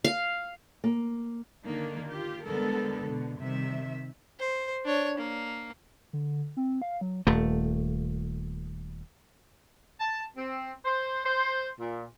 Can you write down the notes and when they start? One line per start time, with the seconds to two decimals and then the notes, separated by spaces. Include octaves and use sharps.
0.04 F5
0.84 A#3
1.64 D3 D#3 A#3 D4 D#4
2.09 F4 G4
2.46 D3 G3 G#3 B3 A4 A#4
3.04 B2 D3
3.40 C3 D#3 G3 E5
4.39 C5
4.85 D4 C#5
5.18 A#3
6.13 D3
6.57 C4
6.82 F5
7.01 F#3
7.27 D#1 A3
9.99 A5
10.36 C4
10.85 C5
11.24 C5
11.79 A#2